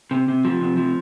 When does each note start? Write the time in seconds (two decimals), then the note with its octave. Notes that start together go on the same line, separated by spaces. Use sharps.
0.11 C3
0.28 C3
0.45 F3
0.61 C3
0.77 F3